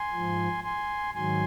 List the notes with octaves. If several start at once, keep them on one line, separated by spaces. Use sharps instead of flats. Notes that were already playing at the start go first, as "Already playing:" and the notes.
Already playing: G#5 C6
G#2 F3
G#5 C6
G#2 D#3 F#3 G#5 C6